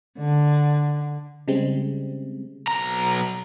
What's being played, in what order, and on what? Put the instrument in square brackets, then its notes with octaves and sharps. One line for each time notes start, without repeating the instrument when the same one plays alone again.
[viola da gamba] D3
[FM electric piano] C#3 G3 G#3 C4
[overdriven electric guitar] B1 A#5